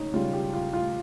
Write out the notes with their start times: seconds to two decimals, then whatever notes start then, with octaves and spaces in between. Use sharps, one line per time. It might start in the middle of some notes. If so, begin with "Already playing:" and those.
Already playing: C#3 C#4 D#4
0.13 C#3 G3 F4
0.33 G4
0.53 F4
0.73 F4